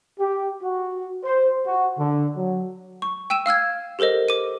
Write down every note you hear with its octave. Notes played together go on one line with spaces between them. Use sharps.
G4
F#4
C5
F#4
D3
F#3
C#6
G5 E6 D#7 E7
F5 E6 F6 G#6
G4 A4 A#4 C5 D#5
D6 D#7